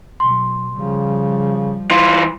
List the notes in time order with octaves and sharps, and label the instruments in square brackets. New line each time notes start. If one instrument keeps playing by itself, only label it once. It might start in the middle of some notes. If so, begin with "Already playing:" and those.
[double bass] B2 F#3 [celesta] C6
[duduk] C#3 [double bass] F3 G3
[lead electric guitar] E3 F4 [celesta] C6